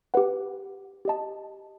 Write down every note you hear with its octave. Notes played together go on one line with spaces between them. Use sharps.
G4 B4 F#5
G4 D#5 A5